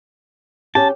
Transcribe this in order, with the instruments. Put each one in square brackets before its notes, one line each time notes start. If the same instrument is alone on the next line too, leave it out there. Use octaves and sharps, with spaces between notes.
[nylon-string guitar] C#4 G4 [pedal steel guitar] A5